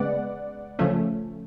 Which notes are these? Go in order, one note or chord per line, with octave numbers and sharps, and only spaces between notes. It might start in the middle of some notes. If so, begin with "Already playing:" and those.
Already playing: C#3 G#3 B3 D5 F#5
C#3 F3 A3 C#4